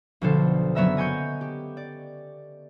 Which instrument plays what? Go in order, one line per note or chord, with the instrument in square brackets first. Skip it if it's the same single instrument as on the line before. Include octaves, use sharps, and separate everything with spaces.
[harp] B1 B2 D3 F3 A4 C5
F#1 F#3 B3 E5 A#5 E6
D#5 G#5 C#6 G6 C#7
G4
D5